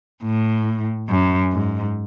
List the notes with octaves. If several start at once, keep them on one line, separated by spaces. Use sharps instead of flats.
A2
F#2
G#2